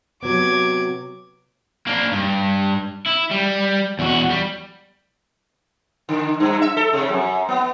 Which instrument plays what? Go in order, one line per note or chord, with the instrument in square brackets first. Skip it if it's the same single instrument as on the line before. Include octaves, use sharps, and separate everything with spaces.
[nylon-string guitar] C3 F#3 B3 [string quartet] D6 G#6
[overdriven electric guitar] A#3 D4
G2
E4
G3
E2 F#4
G3
[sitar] D3
G2
E5
A4
C3
F#2
B3